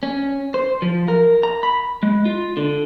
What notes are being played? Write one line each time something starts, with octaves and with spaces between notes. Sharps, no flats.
C#4
C5
F3
A#4
A#5
B5
G#3
F4
D3